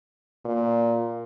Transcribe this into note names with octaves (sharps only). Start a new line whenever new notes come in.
A#2